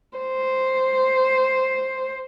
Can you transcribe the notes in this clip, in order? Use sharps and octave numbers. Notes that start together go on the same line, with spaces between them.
C5